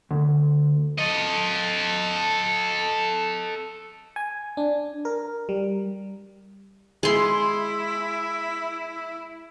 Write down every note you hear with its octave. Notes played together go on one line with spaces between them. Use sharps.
D2
A4 D#5
G#5
D4
A#4
G3
G#3 E4 C6